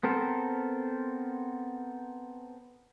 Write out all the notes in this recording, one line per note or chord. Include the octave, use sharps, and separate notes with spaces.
B3 C4 A4 A#4 C5